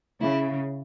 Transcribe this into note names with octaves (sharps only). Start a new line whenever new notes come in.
C#3 E4